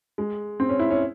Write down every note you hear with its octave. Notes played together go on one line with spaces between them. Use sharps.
G#3
C4
C#4
E4
C#4